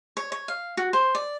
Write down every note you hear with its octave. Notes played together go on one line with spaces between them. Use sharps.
C#5
C#5
F5
F#4
C5
D5